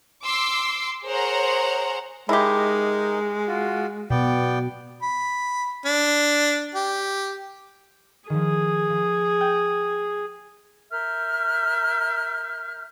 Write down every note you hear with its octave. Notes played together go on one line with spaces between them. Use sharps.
C6 D6 E6
G#4 A#4 C5 C#5 F#5 A#5
G#3 D#4 E4 G4 A#4
F4 F#4
B2 B3 D5 G5
B5
D4
G4
D#3 F3 G#4
F3
G5 G6 A6
A#4 E5 F6 G6